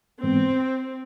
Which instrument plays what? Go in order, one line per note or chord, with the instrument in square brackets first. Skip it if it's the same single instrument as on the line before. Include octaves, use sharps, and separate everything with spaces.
[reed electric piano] G#2 E3 G#3 B3 [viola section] C4